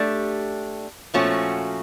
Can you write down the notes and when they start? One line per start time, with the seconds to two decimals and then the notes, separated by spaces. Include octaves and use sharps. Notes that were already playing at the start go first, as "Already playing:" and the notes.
Already playing: A3 D4 G4
1.14 A#2 F3 A3 C#4 F#4